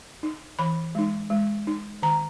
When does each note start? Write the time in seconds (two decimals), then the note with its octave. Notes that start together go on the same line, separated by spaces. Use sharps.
0.23 D#4
0.59 E3 B5
0.95 G#3 D#4
1.30 G#3
1.67 D#4
2.02 D#3 A#5